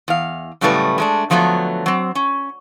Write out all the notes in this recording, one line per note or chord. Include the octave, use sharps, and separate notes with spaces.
E2 F5
F#2 A2 C#3 G3 A3 B4
G#3 A3 D4
D3 F3 F#3 A3 B3
F#3 C4
C#4